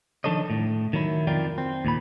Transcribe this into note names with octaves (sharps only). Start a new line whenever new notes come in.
D#3 F3 D4 A4 C#5 D#5
A2
D#3 F#3 E4
F2 D#3 F4 A#4 D5 G5
C4
D#2 A#2 B5